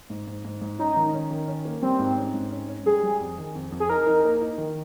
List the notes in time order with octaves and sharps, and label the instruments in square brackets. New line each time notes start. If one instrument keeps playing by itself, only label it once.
[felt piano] G#2
G#2
G#2
G#2
[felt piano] C#4 [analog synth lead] D#4
[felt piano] D#3
C#4
D#3
C#4
A#3
[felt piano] G3 [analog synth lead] C4
[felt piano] G#2
C#4
G#2
C#4
C#4
[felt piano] G3 [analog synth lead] G#4
[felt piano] G3
F2
D#3
F2
F2
[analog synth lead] G#4
[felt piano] D#4 [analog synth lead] A#4
[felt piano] D#4
A#3
D#4
D#3